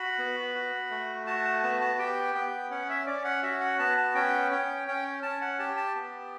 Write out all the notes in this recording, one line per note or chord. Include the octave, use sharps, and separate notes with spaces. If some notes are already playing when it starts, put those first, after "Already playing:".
Already playing: F#4 B5
B3
F#4
A3
F#4 A5
A5
B3 A5
A5
G4 G5
B3 G5
C#4 F#5
E5
C#4 D5
F#5
F#4 E5
F#5
B3 A5
A5
C#4 G5
C#4 G5
C#4 G5
C#4 A5
F#5
G4 A5
A5
B3